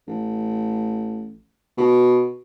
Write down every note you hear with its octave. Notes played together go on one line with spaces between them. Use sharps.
A1
B2